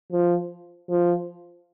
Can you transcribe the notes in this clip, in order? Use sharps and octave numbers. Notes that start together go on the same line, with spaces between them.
F3
F3